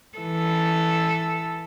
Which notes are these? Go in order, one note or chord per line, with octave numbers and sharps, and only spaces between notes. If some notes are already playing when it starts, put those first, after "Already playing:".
E3 A4